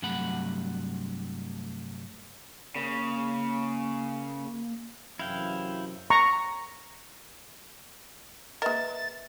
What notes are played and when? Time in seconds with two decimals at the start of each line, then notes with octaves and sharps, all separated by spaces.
0.02 G2 C3 F#3 A3 F#5 B5
2.75 C#3 A#3
5.19 F#2 C3 E3 E4 F5 G5
6.10 A#5 C#6
8.62 G#3 A#3 A#4 B4 D#5 E5 A6